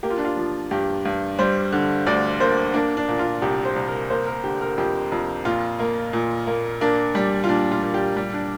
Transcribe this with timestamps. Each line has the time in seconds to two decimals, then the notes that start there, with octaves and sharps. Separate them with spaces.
0.03 A#3 G4
0.10 F4
0.17 D4
0.25 F4
0.37 F3
0.71 G2 G4
1.05 G2
1.39 G3 C5
1.72 D3
2.06 D2 D5
2.40 A#3 C5
2.74 A#3 D4
2.97 D4
3.08 A#2
3.19 F4
3.42 C2 G4
3.65 C5
3.76 C2
3.88 A#4
4.10 A#3 C5
4.26 A#4
4.44 D3 G4
4.61 A#4
4.78 F2 G4
5.12 F2
5.45 A#2 F4
5.80 A#3
6.13 A#2
6.47 A#3
6.81 A#3 D4
7.15 G3
7.44 F4
7.49 A#2 D4
7.72 F4
7.83 A#2
7.94 G4
8.17 G3
8.33 D4